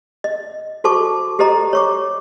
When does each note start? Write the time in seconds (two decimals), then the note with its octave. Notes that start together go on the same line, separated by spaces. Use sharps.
0.24 D#5
0.84 F#4 A4 C5 A5 C#6 D6
1.39 G4 A4 C5 D#5 A#5
1.73 C#5 C#6 D6